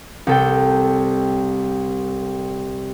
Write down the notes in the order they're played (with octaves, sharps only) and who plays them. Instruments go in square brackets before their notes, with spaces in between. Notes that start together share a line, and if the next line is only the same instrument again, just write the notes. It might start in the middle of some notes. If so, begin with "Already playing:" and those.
[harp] C2 A4 G5